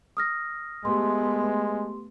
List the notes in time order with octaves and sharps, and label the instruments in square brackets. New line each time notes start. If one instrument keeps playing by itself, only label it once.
[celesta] D#6 F6 A#6
[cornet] G#3 [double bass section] A3 B3 [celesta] G4 C6